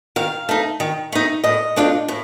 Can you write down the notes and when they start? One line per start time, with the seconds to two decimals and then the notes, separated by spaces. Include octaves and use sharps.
0.16 D#3 F5
0.49 A3 D#4
0.80 D#3
1.12 A3 D#4
1.44 A2 D#5
1.76 A3 D4 F4
2.08 A2